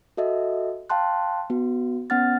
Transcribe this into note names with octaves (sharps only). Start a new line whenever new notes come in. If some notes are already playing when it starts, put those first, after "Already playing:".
F#4 A4 D#5 E5
F5 G5 A5 C6 F#6
B3 F#4
B3 C#4 F#5 F6 A6